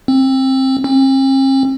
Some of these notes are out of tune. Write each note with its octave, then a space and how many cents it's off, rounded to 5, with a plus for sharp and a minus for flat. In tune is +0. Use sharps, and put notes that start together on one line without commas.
C4 +20
C4 +45